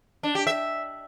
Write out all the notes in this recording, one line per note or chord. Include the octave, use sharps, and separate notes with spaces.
D4
G4
E5